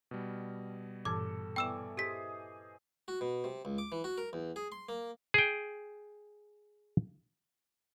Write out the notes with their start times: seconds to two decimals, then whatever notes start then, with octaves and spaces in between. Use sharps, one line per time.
0.11 B2 G3
1.05 G2 A#2 E3 A4 D6 G#6
1.56 E3 B3 D5 G5 B5 C#6 E6 E7
1.97 G4 G#4 C5 D#5 B6
3.08 F#4
3.21 B2
3.44 C3
3.65 C#2
3.78 D6
3.92 E3
4.04 F#4
4.18 A#4
4.33 E2
4.56 G#4
4.72 C6
4.89 A#3
5.34 G#4 G5